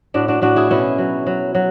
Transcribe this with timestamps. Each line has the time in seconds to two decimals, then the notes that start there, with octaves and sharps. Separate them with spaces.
0.14 A2 D4 F#4
0.28 D4 F#4
0.42 A2 D4 F#4
0.56 E4 G#4
0.70 B2 C#4 E4
0.98 F#3
1.26 F#3
1.55 F#3